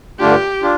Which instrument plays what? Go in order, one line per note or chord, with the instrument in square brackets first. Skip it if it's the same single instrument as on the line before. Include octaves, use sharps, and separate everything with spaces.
[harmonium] G2 D3 A3 D4 F4 [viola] G4
[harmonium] D4 F4